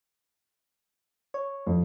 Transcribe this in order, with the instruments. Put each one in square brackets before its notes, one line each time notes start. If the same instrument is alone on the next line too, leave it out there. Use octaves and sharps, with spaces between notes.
[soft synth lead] C#5
[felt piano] F2